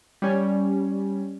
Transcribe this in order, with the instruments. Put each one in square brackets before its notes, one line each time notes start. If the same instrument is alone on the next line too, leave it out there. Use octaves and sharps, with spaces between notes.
[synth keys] G3 C#4